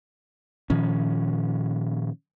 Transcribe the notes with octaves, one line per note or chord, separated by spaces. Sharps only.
A#2 D#3 F3 C#4